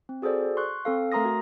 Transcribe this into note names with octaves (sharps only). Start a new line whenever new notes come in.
C4
F#4 G#4 A4 C5 D5
C6 C#6 F#6
C4 A4 F5
A3 A#4 A#5 C6 D#6 A#6
F#4